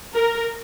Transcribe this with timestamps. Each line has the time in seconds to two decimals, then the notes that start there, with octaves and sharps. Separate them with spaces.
0.13 A#4